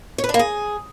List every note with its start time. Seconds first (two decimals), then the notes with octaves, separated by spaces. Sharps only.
0.18 C#5
0.24 B4
0.29 D4
0.34 A#3
0.39 G#4